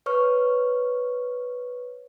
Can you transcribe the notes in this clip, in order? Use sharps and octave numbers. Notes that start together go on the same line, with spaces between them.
B4 C#5 C#6 F6